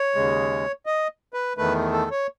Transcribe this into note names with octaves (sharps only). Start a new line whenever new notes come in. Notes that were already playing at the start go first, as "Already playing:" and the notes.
Already playing: C#5
D#2 C#3 G#3
D#5
B4
E2 D#3 A3 B4
A4
C#5